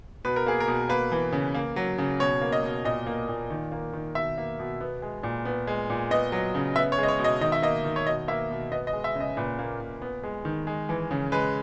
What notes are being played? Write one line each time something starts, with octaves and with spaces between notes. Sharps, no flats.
B2 B4
A#4
A#3 G#4
A#4
B2
A#3 B4
E3
C#3
A#3
F#3
C#3
B2 C#5
A#3
D#5
B2
A#2 D#5
A#3
A#2
D#3
A#3
D#3
B2 E5
A#3
B2
B3
G#3
A#2
B3
G#3
A#2
B3 D#5
F#3
C#3
B3 E5
C#5
G#3 D#5
C#5
B2
D#5
D#3 D#5
E5
A#3 D#5
D#3
C#5
B2 D#5
A#3 E5
B2
B3 D#5
D#5
G#3
E5
C#3
D#5
A#2 B4
A#3
A#2
B3
G#3
D#3
G#3
E3
C#3
G#3 B4